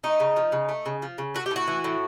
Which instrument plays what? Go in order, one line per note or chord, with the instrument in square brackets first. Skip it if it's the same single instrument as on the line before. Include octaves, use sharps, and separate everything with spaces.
[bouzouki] A3 D#4
C#3
F3
C#3
A3
C#3
F3
C#3
A3 F#4
G4
A2 F#4
E3
A2